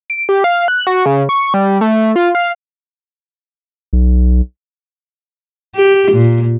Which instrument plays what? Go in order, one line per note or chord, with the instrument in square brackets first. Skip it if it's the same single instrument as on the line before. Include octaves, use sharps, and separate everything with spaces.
[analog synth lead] D7
G4
F5
F#6
F#4
C#3
C#6
G3
A3
F4
F5
[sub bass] B1
[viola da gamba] G4
A#2